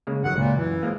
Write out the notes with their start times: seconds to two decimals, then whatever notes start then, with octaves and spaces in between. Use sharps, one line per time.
0.07 C#3 G#3 A#3
0.24 G1 D#3 F#3 F#5
0.37 C#2 A#2
0.56 F#2 E3
0.83 F3 G#3 A#3